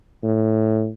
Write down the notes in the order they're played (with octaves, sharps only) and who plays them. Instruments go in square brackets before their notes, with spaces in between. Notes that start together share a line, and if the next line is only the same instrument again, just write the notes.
[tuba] A2